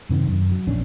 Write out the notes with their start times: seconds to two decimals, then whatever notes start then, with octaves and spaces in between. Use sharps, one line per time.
0.09 F#2 C3 D#3
0.28 F#2
0.52 F#3
0.67 A#1 E2 C#4 D4